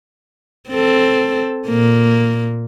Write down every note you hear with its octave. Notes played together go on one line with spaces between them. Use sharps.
C4 A4
A#2 A#3